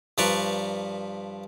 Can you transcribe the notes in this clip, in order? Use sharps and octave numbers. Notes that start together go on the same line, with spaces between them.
G2 F3 B4 D5 A#5 C#6